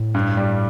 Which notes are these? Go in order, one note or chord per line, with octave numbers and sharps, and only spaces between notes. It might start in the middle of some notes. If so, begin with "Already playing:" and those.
Already playing: A2
G2
G3